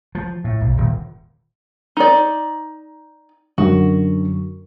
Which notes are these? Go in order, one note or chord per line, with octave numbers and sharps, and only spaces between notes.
F3
A2
B1
D#1
D#4 D5
F#2 D3 F#4